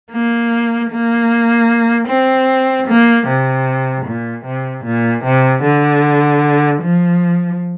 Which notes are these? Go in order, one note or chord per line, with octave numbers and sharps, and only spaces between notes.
A#3
A#3
C4
A#3
C3
A#2
C3
A#2
C3
D3
F3